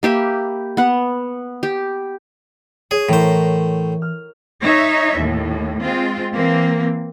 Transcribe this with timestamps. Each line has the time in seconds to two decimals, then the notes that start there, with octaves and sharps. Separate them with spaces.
0.03 A#3 G4 E5 B5
0.77 B3 F#5
1.63 G4
2.91 G#4 C#5
3.09 A2 E3 A#4 C5
4.02 F6
4.61 D#4 C#5 E5
5.18 D#2 A2
5.82 G#3 C4 F4
6.32 E3 A#3 C4